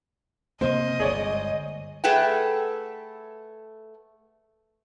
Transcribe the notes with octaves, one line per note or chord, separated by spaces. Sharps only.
C3 A#3 C4 C5 D#5
G1 C#2 G#4 C#5 D5
A3 G#4 A4 B4 F#5 G5